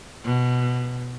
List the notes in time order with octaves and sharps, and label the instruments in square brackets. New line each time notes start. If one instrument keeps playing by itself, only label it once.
[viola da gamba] B2